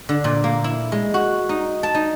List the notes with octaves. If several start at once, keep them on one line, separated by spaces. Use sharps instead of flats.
D3
A#2
A#3
E4
G#3
F#4
D#4
A5
D#4